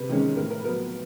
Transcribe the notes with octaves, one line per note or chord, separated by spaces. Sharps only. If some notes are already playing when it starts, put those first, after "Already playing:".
Already playing: C3 B4
D#3 G#3 C#4
A2 A#4
A#4
B4
F#3 B3 A#4